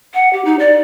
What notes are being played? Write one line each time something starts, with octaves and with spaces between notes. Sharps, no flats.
F#5
G4
D#4
D5